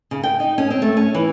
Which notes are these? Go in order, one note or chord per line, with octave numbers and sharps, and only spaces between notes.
C#3
G5
D#4
C#4
C4
A3
C#4
E3